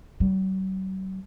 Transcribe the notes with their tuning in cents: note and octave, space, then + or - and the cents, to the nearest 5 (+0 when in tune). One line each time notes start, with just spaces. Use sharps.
F#3 +45